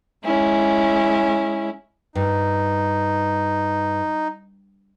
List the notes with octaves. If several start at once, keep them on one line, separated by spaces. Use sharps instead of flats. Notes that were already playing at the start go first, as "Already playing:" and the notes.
G#3 C#4 E4
G2 D#4